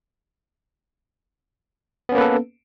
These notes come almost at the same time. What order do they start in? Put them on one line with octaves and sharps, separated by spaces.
B3 C#4 A#3 B4 A4